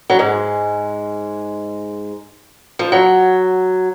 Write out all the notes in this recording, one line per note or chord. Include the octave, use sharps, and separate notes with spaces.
F#3
G#2 G#3
F3
F#3